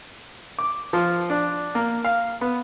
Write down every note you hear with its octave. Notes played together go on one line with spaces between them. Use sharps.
D6
F3
D4
A#3
F5
B3